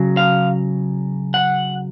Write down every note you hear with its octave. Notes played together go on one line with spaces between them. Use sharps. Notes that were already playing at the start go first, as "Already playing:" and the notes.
Already playing: C#3 F#3
F5
F#5